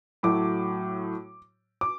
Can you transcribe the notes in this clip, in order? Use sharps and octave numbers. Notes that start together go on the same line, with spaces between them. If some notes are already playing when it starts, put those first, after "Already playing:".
A2 F#3 A3 D6
D6